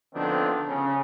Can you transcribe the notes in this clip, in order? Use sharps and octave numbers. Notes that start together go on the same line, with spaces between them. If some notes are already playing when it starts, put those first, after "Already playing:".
D3 D#3 F3 B3 C4 D4
C#3